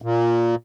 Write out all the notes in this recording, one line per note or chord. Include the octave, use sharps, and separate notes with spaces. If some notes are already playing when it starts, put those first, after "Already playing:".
A#2